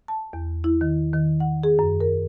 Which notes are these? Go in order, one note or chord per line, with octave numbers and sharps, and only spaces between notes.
A5
E2
E4
D#3
D#3
F#5
G#4
F#2
A#4